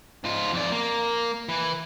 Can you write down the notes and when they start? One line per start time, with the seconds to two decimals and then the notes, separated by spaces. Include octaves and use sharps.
0.24 G#2 F4
0.54 F2 D5
0.72 A#3
1.49 E3